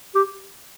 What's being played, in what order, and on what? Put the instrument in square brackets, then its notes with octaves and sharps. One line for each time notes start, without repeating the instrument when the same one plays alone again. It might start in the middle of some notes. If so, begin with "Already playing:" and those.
[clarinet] G4